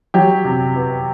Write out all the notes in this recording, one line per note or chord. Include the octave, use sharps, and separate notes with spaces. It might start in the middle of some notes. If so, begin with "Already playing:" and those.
F#3 G4
C3
B3